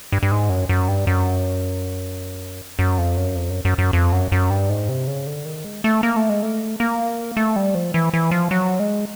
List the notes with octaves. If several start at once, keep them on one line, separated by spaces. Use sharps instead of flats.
G2
G2
G#2
F#2
F#2
G2
F#2
F#2
F2
F#2
F2
F#2
F#2
F#2
F2
F#2
F#2
G2
G#2
C3
C#3
D3
D#3
G#3
A3
A#3
A3
G#3
A3
A#3
A3
G3
F3
E3
E3
F3
F#3
G#3